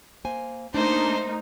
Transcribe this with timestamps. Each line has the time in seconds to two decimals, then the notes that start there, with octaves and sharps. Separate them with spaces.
0.24 A#3 C5 G#5
0.74 A3 A#3 D4 D#4 C5